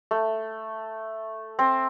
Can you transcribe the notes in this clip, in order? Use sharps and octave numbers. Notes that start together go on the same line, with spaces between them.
A3
C4